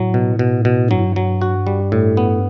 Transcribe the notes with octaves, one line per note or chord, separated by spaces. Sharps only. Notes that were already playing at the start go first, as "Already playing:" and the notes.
Already playing: A2 F#3
B2
B2
B2
G2 F#3
F#3
F#4
G3
A2
B3